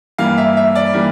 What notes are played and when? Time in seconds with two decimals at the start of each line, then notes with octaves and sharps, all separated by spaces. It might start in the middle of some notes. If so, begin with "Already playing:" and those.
0.18 G2 E3 G3 A#3 F5
0.37 E5
0.57 E5
0.75 D5
0.94 E3 G3 A#3